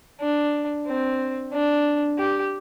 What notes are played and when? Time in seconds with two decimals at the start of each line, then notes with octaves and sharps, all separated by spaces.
0.21 D4
0.87 C4
1.53 D4
2.18 G4